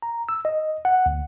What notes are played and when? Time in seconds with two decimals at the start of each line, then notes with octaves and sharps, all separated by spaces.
0.02 A#5
0.29 E6
0.45 D#5
0.85 F#5
1.06 D2